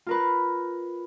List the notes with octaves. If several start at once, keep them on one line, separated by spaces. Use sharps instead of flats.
F4 A#4 B4